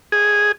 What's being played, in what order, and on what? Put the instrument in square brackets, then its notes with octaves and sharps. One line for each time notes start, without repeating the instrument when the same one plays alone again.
[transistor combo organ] G#4